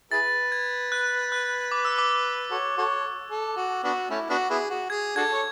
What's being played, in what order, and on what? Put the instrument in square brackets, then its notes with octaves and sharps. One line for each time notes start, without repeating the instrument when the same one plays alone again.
[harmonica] E4 G#4 B4 [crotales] A6
[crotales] G#6
F#6
F#6
D6
E6
D6
[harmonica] F#4 A4 C#5
F#4 A4 C#5
A4
F#4
B3 D4 F#4
A3 C#4 E4
B3 D4 F#4
B3 E4 G#4
F#4
[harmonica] G#4 [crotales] G#6
[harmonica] D4 F#4 A4 [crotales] G#6
[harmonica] C#5